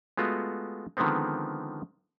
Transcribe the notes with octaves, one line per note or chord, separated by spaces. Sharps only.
G#3 A3 B3 F4 F#4
D3 D#3 F3 G#3 B3 C4